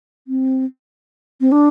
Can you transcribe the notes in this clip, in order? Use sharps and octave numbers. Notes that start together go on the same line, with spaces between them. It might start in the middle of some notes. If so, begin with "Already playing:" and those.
C4
C4
D4